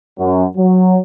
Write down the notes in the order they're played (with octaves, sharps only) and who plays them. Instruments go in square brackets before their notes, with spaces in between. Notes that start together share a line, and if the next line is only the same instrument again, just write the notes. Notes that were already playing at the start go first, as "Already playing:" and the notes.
[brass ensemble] F#2
F#3